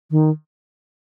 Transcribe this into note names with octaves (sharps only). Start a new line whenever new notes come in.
D#3